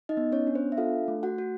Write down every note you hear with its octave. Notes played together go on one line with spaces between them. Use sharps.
D#4 D#5
B3
C#4 C#5
D4
C5
E5
F4 A4 F5
A3
F#4 F#5
F#4